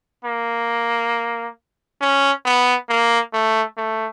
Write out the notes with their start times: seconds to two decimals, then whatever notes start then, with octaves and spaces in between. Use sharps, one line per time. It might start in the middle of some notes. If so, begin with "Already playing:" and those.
0.25 A#3
2.01 C#4
2.45 B3
2.89 A#3
3.33 A3
3.77 A3